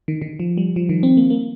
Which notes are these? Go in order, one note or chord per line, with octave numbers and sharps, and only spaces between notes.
D#3
D#3
F3
G3
F3
D#3
C4
A#3
A#3